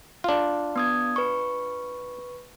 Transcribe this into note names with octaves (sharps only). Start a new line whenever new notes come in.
D4 F4
B3 D#6 G#6
B4 C#6